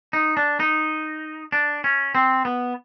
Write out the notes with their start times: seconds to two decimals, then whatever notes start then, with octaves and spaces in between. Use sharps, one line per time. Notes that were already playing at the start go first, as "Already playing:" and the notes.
0.13 D#4
0.37 D4
0.60 D#4
1.52 D4
1.84 C#4
2.15 C4
2.45 B3